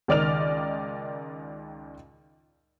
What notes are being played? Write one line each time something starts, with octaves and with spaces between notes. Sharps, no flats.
C#2 D#3 D5 D#5 F6 F7